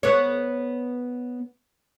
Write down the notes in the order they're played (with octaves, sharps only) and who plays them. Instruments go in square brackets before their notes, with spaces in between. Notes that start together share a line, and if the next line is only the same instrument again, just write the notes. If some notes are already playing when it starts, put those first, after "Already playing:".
[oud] B3 C#5